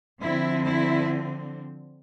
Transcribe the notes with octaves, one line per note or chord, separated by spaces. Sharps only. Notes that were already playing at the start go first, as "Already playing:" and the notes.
D3 F3 C4 E4
E4